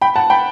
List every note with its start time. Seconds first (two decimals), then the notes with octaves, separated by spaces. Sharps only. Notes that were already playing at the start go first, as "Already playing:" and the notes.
0.02 G5 B5
0.16 F#5 A5
0.30 G5 B5